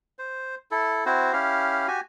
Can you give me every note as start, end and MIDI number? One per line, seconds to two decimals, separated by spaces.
0.19 0.55 72
0.71 1.04 64
0.71 1.04 69
1.06 1.32 60
1.06 1.32 64
1.06 1.32 66
1.06 1.32 72
1.33 1.88 61
1.33 1.88 64
1.33 1.88 67
1.33 1.88 77
1.88 2.00 66
1.88 2.00 67
1.88 2.00 80